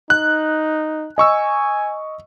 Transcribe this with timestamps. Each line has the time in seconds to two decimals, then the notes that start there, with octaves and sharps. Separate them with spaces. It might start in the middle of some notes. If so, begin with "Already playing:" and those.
0.10 D#4 F#6
1.18 D#5 G#5 C#6 E6